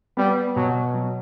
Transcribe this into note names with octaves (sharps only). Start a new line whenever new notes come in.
G3 B3
B2 F#3
F#3